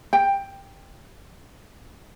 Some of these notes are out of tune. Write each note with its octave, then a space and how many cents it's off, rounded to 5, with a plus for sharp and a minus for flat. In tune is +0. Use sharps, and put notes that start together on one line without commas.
G5 +10